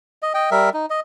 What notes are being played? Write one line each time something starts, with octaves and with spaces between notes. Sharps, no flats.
D#5
D#5 G5
G3 A#4 E5
D#4
D#5